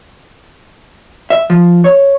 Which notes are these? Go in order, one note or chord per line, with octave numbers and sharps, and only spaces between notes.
E5
F3
C#5